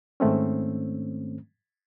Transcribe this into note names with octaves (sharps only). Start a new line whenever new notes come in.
G#2 D#3 A3 C4 C#4